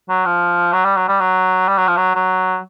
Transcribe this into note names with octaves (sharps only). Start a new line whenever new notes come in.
F#3
F3
F#3
G3
F#3
G3
F#3
G3
F#3
F3
F#3
F#3